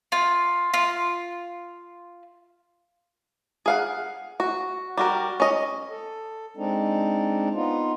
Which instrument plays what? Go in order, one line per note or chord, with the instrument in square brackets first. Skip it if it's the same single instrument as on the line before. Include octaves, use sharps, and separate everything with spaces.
[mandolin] F4
F4
[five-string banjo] G#4 F5 F#5
F#4
G3 F#4 A#4
C#4 D#5
[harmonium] A4
G#3 C4 D4 D#4
B3 D#4 F4